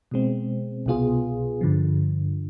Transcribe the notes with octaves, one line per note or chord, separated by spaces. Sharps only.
B2 G#3 C4
C2 B2 B3 F4 G#4
G2 D3 F3